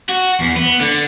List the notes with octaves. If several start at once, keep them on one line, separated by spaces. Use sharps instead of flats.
F#4
E2
B3
D3